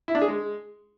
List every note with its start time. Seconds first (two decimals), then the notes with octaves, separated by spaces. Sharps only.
0.08 E4
0.15 D4
0.21 G#4
0.28 G#3